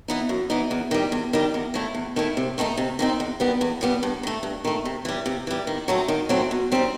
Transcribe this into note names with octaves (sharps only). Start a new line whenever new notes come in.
E3 B3 D#4
F#2
E3 B3 D#4
E2
D#3 G3
E2
D#3 G3
E2
D#3 A3 E4
E2
D#3 A3 E4
C3
D#3 A3 C4 D#4
C3
D#3 A3 C4 D#4
E2
D#3 G3 B3
E2
D#3 G3 B3
G2
D#3 A3
G2
D#3 A3
C3
E3 G3
C3
E3 G3
D#3
F#3 A3 C4 D#4
D#3
F#3 A3 C4 D#4
B2
G3 C4 D#4